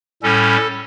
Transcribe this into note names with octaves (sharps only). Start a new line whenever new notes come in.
A2 G3 C#4 A4